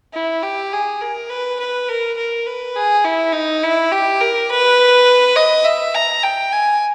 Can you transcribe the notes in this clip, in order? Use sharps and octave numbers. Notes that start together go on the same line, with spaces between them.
E4
G4
G#4
A#4
B4
B4
A#4
A#4
B4
G#4
E4
D#4
E4
G4
A#4
B4
D#5
E5
A#5
G5
G#5